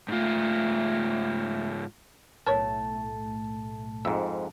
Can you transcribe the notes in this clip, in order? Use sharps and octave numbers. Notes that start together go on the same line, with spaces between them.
G#2 A3 F4
B1 A2 A3 A#4 B4 C#5 A5
F2 G#2 E5